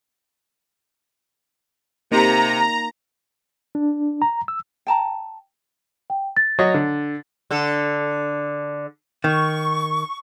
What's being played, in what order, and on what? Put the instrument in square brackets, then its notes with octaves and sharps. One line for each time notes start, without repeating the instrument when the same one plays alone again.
[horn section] C3 [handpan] A#3 D#4 [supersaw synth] A#5
[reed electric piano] D4
A#5
E6
[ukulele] G5 A5 A#5
[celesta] G5
A6
[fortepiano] F#3 C#5 D#5
D3
[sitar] D3 A4
[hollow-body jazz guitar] D#3 [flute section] C#6